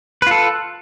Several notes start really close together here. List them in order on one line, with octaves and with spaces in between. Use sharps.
B4 F4 A4